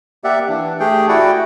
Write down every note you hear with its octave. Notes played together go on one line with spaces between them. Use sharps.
A#3 G4 D5 E5 F#5
E3 D4
A3 G4 G#4 G5
E4 F#4 D5 F#5 G5